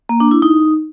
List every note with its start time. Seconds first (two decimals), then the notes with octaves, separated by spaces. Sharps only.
0.09 A#3
0.20 D4
0.31 E4
0.42 D#4